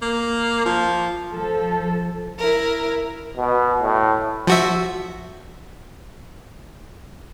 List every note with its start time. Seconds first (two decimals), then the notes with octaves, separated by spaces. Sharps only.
0.02 A#3
0.66 F3
1.32 F3 A4
2.38 E4 A#4
3.37 B2
3.82 A2
4.47 F3 F#4 E5